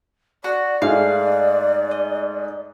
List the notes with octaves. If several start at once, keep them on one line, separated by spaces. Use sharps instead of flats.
F#4 D5
G#2 A3 G#4 F5
D#5